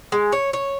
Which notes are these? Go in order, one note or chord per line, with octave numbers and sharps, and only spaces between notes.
G#3
C#5
C#5